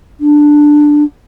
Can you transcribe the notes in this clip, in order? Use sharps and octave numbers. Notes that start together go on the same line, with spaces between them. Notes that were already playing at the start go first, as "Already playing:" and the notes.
D4